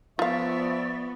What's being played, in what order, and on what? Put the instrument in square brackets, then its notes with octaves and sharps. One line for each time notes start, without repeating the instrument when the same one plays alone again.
[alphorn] F3 [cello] B3 [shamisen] F4 F5 [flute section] D5 E5 C#6